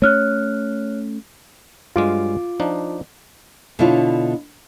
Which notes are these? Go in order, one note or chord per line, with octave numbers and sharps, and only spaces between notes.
A3 C#4 C#5 F6 F#6
G2 F#3 G#3 F4 D6
F3 D4 D#4
B2 D3 D4 E4 F4 C#5